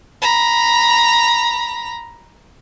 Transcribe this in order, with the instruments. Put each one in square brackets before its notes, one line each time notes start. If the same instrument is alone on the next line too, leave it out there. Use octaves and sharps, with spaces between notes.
[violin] A#5 B5